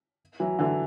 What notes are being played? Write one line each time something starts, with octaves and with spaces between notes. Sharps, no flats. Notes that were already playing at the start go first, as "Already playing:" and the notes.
E3 F#3
D3 E3